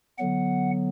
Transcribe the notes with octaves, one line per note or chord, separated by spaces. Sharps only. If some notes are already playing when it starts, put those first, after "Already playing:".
D3 F#3 B3 F#5